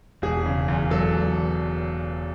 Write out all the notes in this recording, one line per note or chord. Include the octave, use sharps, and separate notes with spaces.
E1 G#4
C#3
E2
F#3 A4
E1